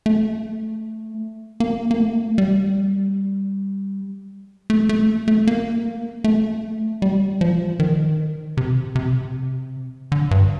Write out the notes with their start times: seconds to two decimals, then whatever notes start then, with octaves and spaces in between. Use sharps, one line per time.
0.06 A3
1.60 A#3
1.91 A#3
1.99 A3
2.38 G3
4.70 A3
4.89 A3
5.28 A3
5.47 A#3
6.24 A3
7.02 G3
7.41 F3
7.80 D#3
8.57 C3
8.95 C3
10.12 D3
10.31 G2